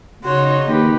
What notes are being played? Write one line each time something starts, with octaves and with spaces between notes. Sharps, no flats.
C#3 D#4 F#4 C#5 C6
D#2 G4 B4